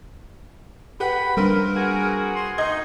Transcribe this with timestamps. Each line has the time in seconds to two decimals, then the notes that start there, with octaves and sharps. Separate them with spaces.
1.00 G4 B4 F#5 B5
1.37 G3 A#3 C4 D4 A#4 B4
1.76 F#4 G#4
2.35 C6
2.58 D#4 D#5 G#6